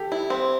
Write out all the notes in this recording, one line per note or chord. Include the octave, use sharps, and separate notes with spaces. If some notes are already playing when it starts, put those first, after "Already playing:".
Already playing: G4 A4
E4
C4